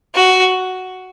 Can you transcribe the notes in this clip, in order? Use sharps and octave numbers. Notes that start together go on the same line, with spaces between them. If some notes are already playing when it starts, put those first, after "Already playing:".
F#4